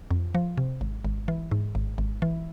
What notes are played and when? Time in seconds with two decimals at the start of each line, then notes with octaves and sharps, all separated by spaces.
0.11 F2
0.35 F3
0.58 C3
0.81 G#1
1.05 G#1
1.28 E3
1.52 G#2
1.75 G#1
1.98 G#1
2.22 E3